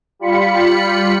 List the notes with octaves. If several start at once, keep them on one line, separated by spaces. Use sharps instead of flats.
G3 F4 B5 C#7